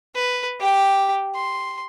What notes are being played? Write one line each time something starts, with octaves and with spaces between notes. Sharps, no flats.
B4
G4 G5
C6